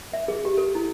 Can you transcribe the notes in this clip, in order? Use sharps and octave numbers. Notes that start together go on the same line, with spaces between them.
E5
G#4
G4
A4
E4